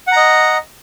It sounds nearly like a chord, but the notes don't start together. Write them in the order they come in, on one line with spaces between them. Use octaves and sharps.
F#5 A#5 D#5